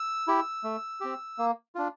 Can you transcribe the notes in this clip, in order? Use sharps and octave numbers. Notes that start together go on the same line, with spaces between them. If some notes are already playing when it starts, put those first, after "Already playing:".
Already playing: E6
E4 G4
A3
C4 G4
A#3
D4 F4